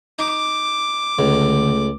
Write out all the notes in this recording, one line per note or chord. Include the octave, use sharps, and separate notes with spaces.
D#4 D6
C#2 D3 A3